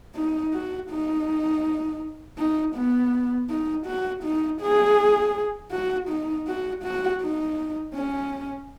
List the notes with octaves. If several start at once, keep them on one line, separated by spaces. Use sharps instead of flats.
D#4
F#4
D#4
D#4
B3
D#4
F#4
D#4
G#4
F#4
D#4
F#4
F#4
D#4
C#4